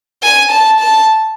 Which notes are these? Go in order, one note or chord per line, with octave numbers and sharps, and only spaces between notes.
G#5
A5
A5